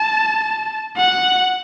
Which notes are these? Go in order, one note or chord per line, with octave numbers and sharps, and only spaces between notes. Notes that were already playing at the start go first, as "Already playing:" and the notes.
Already playing: A5
F#5